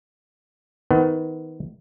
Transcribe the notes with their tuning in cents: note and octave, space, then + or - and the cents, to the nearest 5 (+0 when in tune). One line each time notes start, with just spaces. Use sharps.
D#3 +35 B3 +25